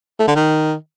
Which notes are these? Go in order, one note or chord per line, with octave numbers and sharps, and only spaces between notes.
A3
D3
D#3